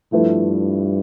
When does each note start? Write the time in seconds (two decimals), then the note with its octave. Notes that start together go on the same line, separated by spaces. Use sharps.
0.12 G2 F3 A3 E4 B4